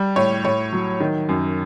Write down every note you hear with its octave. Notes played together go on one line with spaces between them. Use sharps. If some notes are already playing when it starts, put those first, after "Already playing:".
Already playing: G3
A2 C#5
A2 C#5
F#3
D#3
F#2